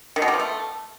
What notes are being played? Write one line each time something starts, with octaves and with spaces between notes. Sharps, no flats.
D#3
B2
G3
F3
A3